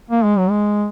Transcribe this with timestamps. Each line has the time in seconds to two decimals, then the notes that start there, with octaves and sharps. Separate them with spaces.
0.11 A#3
0.24 G#3
0.38 F#3
0.50 G#3